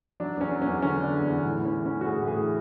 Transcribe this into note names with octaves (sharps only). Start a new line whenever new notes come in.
F#3 D4
E2 C#4
F#3
C#4
E2
D3 C#4
D3
D4
E2
E2
A2 E4
E3 C#4
E3
C#4
E3
F#4
A2 G#4
A2
G#4
E3